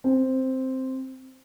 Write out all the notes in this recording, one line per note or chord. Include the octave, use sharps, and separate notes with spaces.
C4